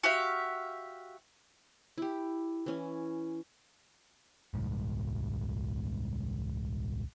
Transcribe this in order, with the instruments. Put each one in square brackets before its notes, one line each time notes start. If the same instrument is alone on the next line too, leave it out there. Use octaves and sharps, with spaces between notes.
[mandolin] F#4 G4 E5 F5
[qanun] E4 G4
E3 C#4 G#5
[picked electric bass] D#1 C2 G#2